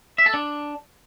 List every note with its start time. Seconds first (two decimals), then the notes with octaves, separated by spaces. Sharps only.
0.18 E5
0.26 A4
0.34 D4